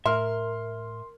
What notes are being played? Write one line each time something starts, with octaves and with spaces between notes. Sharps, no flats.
A2 A#4 E5 C6 F6